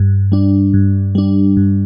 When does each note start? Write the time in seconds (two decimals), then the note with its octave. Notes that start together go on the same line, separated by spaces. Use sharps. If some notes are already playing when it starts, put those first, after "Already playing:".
Already playing: G2
0.32 G3 D4
0.74 G2
1.15 G3 D4
1.57 G2